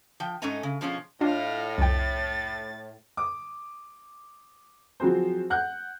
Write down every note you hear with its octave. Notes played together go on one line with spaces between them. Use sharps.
F3 G5
G#2 A3 C#4 D#5 G#5 A#5
C#3
B2 F3 C#4 F4 G#4
A2 D4 F4 D#5 F5
C2 F2 G5 A6
D6 D#6
F3 F#3 C4 F#4 G#4 C5
F#5 F#6 G6